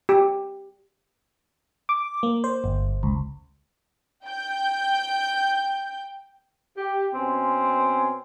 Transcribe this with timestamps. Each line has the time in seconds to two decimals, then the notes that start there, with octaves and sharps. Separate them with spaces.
0.09 G4
1.89 D6
2.23 A#3
2.44 C5
2.64 G1
3.03 C#2
4.24 G5 G6
6.76 G4
7.13 B2 C4 C#4 G#5 C6